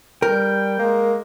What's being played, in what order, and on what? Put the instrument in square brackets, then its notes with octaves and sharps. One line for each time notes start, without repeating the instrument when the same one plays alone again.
[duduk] G3 [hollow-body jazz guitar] A#4 [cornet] G5
[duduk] G#3 [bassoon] A#3